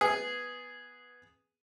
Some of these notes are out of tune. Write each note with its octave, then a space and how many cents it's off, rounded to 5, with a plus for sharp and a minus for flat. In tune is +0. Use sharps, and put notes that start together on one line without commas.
B3 +0 G#4 +0